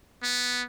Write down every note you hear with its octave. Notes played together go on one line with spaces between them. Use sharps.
B3